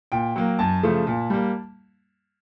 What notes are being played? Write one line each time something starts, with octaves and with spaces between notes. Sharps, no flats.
A#2 G5
F#3 A#3
F#2 A5
C#3 F3 A3
A#2
G3 A#3